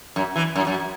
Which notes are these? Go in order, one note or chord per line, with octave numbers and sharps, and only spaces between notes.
F#2
E3
F#2
F#2